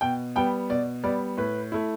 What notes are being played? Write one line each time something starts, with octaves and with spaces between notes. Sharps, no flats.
B2 G5
G3 B3 G5
B2 D5
G3 B3 D5
A2 B4
A3 E4